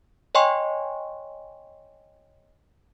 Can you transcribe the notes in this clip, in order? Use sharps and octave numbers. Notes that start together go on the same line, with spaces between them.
C#5 D#5 G5 G#5 C6 C#6